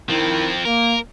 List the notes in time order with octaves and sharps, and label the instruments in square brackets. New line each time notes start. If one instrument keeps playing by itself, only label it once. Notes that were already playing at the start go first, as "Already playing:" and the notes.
[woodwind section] D#3 D#4 E4 [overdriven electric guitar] F3 C4
[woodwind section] A#3 [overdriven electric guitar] A#4